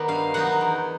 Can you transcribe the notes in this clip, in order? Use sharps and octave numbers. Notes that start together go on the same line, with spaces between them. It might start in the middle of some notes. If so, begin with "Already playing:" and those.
Already playing: D#3 B3 D#4 D5
G2 F5
D#3 F#3 B3 D#4 F#5
E2